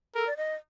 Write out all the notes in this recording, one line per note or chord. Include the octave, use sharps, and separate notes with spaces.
A4 A#4
D5
D#5